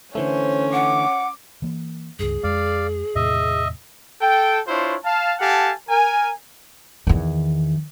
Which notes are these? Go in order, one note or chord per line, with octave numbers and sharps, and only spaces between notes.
D3 E3 A3 C#4 C5
F#5 D6
E3 A#3
C#2 G2 G#4
F2 G#3 D5 F5
E2 A2 C3 D#5 E5
A4 G5
D4 E4 F4 C5 C#5
F5 A5
G4 A4 F5 F#5 G#5 A5
A#4 G#5
E2 D#3